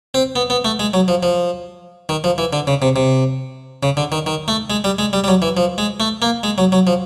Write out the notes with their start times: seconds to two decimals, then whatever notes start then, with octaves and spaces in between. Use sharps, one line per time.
0.14 C4
0.36 B3
0.50 B3
0.65 A3
0.80 G#3
0.94 F#3
1.08 F3
1.23 F3
2.09 D#3
2.24 F3
2.38 E3
2.53 D3
2.67 C#3
2.82 C3
2.96 C3
3.83 C#3
3.97 D3
4.12 D#3
4.26 D#3
4.48 A3
4.70 G#3
4.84 G3
4.99 G#3
5.13 G3
5.24 G3
5.28 F#3
5.42 E3
5.57 F3
5.78 G#3
6.00 A3
6.22 A#3
6.43 G#3
6.58 F#3
6.72 F#3
6.87 F3